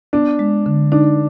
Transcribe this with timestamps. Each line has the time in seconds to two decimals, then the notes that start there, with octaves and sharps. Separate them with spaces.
0.13 B3 D4
0.39 G#3
0.66 D3
0.92 D4 D#4